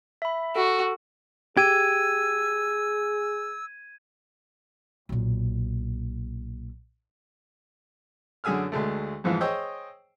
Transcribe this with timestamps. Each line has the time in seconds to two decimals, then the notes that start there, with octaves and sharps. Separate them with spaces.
0.22 E5 B5
0.56 F#4 A4
1.57 G4 G#4 E6 G#6 D#7
5.09 B1 A#2
8.44 F#2 D3 G#4 G#5 E6 F6
8.72 D2 G#3 A3
9.24 F2 G#2 E3 F3 F5
9.41 G#4 C5 C#5 D#5 G5 E6